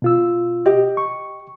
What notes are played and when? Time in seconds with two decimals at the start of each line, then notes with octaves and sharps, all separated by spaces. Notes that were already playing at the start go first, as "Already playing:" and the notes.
0.02 B2 F4 E6
0.66 G4 D#5
0.97 C#6